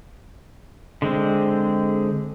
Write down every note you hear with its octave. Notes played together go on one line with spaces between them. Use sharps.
D3 G#3 C4